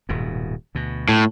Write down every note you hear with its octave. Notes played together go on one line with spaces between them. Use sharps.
D#1 G#2 B2
D2 B2
A2